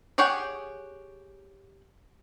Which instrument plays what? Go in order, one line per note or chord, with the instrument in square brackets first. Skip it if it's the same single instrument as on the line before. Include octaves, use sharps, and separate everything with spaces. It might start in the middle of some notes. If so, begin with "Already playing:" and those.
[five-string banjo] G4 G#4 C#5 F#5 G5